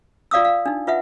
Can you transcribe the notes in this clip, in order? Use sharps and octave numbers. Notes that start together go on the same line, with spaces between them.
F4 D5 F5 D#6 E6
F5
D4 D#4
F4 B4 E5 F#5